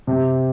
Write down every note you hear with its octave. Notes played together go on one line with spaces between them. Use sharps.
C3